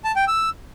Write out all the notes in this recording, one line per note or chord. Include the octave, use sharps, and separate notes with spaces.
A5
G5
E6